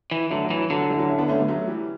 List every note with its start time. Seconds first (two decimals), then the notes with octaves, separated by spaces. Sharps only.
0.11 E3
0.30 D3 F#3 A3
0.44 F#3
0.50 E3
0.57 F#3
0.70 D3 F#3
0.80 F#3
0.90 E3 G3
0.99 F#3
1.09 C#4 E4
1.18 B3 D4
1.28 A3 C#4
1.38 G3 B3
1.48 F#3 A3
1.68 E3 G3